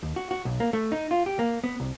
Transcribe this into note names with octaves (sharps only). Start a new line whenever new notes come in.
D#2
F#4
F#4
B1
A#3
A3
D#4
F4
G4
A#3
B3
C2